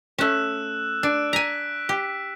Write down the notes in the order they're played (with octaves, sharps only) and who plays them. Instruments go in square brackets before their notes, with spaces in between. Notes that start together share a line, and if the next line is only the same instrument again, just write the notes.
[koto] A3 C#4 [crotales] E6 F#6 E7
[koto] D4 [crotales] F#6 D7
[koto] G#5 A#5 [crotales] B6
[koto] G4